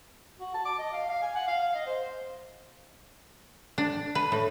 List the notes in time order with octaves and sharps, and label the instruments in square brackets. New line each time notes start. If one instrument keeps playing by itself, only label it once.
[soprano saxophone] F#4
A5
D6
D#5
F5
F5
G#5
F#5
F5
F5
D#5
C5
[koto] D4
B4
A2